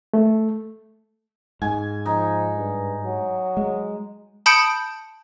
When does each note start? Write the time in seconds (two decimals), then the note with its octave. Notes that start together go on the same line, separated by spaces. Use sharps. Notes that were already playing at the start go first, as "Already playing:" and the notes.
0.14 A3
1.62 G#2 G#5
2.06 F3 D#4
2.56 G2
3.03 F#3
3.57 G#3
4.46 A5 B5 D#6 G6 C#7 D7